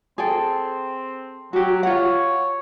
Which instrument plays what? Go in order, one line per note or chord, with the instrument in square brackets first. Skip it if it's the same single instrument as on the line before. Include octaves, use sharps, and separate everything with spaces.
[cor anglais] C4 [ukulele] G#4 A4 G5
[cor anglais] F#3 [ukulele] F#4 G4
[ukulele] F4 F#5 [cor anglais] C#5